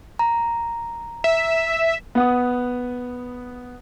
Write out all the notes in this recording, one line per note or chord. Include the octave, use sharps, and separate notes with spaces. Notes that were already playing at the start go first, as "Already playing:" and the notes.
A#5
E5
B3 F#5 D#6